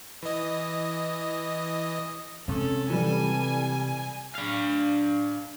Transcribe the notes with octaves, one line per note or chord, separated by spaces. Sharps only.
E3 D#5
C3 G#3 C4 C#4 A4
E3 G3 A4 G#5
D4 F5